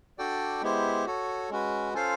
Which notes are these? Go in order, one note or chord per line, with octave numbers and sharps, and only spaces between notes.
D4 F#4 A4 D5 G5
G#3 B3 E4 G4 C5
F#4 A4 C#5
G#3 C#4 F#4 B4
C#4 F4 A4 C5 F5